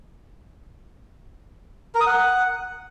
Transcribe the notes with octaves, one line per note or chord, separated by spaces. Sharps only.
A#4
D#6
F#5